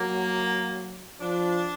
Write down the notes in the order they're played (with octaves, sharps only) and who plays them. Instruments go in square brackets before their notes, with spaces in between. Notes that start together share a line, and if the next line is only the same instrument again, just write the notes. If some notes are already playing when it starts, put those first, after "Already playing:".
Already playing: [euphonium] F#3 [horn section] A#3
[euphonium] F3 [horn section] D4